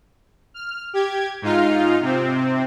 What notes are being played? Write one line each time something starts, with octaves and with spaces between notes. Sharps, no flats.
F6
G4 G#6
G#2 D#4 F4 F6
C3 C4